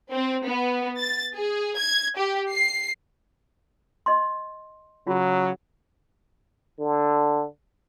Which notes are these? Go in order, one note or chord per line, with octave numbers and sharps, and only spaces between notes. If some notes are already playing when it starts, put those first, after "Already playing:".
C4
B3
A6
G#4
G#6
G4
C7
D#5 C6
C#3 F#3 F4
D3